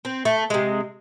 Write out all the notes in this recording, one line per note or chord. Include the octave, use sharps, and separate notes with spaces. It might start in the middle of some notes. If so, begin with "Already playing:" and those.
C4
A3
C3 G#3